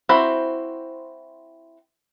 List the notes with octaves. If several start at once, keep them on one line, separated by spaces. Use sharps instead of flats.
C4 E4 F#4 C5 B5